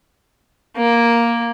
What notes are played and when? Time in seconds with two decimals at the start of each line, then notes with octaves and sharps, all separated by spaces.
0.76 A#3